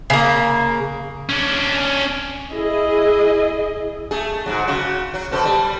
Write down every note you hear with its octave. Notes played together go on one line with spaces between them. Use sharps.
C#3 A#3
C#4 D4
E4 G#4 D#5
A3 G#4
G#2 C3 F#3
C#3 F#4
F#3
B2 A4 C5
G3